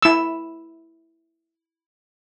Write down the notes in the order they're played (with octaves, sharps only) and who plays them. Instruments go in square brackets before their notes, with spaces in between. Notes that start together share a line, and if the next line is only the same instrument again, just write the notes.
[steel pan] E4 E6